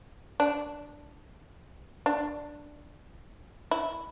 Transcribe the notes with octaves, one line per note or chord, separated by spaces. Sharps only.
D4
D4
E4